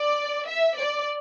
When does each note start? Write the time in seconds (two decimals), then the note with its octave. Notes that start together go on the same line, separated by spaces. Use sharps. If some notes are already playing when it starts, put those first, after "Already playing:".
Already playing: D5
0.48 E5
0.77 D5